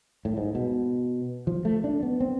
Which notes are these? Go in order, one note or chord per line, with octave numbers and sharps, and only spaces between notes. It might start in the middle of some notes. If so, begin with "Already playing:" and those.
A2
G#2
B2
F3
A3
D4
B3
C4